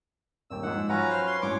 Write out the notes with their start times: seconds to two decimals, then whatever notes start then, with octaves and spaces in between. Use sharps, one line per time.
0.50 D#1 D#2 G5 E6
0.63 G#2 F3 D#4 F#5
0.89 F#3 C#4 F4 F#4 B4 F#5 A#5
1.10 C5 F6
1.27 C6
1.42 A1 F#2 C#5 C6 D6